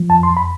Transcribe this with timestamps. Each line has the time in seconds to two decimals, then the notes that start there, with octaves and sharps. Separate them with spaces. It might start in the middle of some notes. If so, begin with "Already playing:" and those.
Already playing: F3
0.10 F2 A5
0.23 C6
0.30 F2
0.37 B5